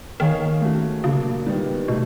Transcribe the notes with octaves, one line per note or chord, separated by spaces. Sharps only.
D#3 A#3 D#4 G#4 C#5 F5
A3 C#4 F#4
A#2 C#3 F#3 A#3 D4
D#3 G3 B3
B2 F#3 A3